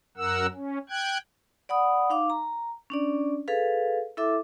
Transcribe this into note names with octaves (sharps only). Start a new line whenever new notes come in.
F#2 A#4 F#5 E6
C#4
G5 F#6 G#6
D5 F#5 B5 D#6
D#4 F5 D6
A#5
C#4 D4 D5
G#4 A4 B4 F5
E4 A4 E5 D6